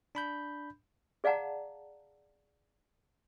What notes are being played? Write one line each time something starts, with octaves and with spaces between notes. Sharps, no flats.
D4 B5 G6
G#4 D5 F5 F#5 A5 A#5